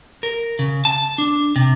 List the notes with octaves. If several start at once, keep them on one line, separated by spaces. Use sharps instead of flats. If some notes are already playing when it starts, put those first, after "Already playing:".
A#4
C#3
A5
D4
C3